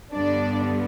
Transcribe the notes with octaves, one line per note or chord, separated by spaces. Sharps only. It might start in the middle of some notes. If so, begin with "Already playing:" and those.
G2 D3 G3 B3 D4 D5